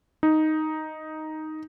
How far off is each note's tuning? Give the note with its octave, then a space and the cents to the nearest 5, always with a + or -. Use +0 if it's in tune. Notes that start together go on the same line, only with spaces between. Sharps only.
D#4 +0